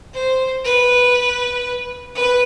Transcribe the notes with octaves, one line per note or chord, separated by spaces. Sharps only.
C5
B4
B4